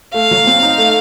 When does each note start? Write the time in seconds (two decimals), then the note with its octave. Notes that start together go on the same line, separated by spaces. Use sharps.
0.14 A3 F5
0.31 F#3
0.47 C4
0.63 D#4
0.78 A3